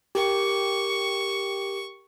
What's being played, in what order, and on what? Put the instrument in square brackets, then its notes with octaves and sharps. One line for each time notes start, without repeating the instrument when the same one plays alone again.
[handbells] G4 A#4 G5 [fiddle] C#6